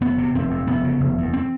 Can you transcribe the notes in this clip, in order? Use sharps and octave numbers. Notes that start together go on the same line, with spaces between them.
F1 B3
C3
F1 C4
F2
F1 B3
C#3
F1
E2
C4